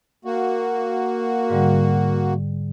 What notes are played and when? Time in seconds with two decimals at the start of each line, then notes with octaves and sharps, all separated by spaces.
0.25 A#3 F#4
1.50 G#2 D3 G3